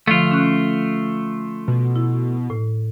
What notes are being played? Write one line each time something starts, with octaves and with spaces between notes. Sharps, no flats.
D3 F3 A3 F4
C#4 F#6
B2
E4
A2